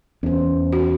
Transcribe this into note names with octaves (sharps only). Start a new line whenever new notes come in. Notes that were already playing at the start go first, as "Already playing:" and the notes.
E2 C#4 C5
F#4